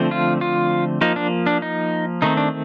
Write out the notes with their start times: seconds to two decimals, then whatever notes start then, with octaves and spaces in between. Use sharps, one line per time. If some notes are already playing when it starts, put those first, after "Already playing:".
Already playing: D3 F3 A3 C4
0.11 F4
0.41 F4
1.01 F3 A#3 D#4
1.16 D4
1.46 D4
1.62 D#4
2.22 D#3 A3 C4 D#4
2.37 D4